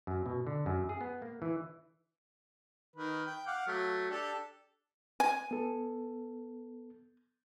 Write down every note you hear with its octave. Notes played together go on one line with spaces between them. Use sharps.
F#2
B2
D3
F#2
G#4
B3
A#3
E3
D#3 B4
G5
F5 F#5 D6
F#3 A3
D4 G4 A4
G#5
B3 A4